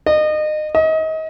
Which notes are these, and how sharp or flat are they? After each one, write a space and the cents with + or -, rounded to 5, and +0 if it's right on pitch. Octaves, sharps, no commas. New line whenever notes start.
D#5 -30
D#5 +30